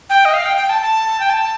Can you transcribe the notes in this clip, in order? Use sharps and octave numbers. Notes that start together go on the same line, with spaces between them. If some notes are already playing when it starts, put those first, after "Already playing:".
G5
D#5
F5
G5
G5
A5
A5
G5
A5